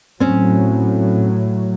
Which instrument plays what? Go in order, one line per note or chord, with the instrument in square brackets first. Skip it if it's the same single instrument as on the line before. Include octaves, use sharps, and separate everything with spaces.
[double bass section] A2 F#3 [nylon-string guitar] C4 C#4